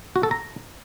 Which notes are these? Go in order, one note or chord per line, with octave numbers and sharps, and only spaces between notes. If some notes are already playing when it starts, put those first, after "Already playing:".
F#4
A4
A#5